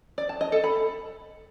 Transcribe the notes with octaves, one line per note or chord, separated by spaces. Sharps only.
D5
A5
D#5
A4
B5